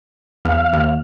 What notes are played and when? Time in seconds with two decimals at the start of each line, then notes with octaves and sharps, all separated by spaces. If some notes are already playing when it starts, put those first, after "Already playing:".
0.45 E2 F5
0.73 D#2